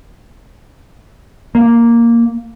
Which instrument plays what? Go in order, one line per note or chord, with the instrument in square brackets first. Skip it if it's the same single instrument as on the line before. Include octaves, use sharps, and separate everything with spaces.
[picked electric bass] A#3